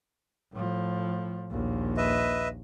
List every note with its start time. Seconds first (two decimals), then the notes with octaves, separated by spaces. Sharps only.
0.53 A2 F3
1.50 A#1 D#2
1.97 B4 D#5 E5